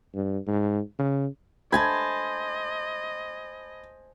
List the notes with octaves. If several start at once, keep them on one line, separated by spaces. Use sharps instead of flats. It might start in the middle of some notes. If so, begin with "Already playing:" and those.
G2
G#2
C#3
C5 D#5 G#5 A5 B5 G#6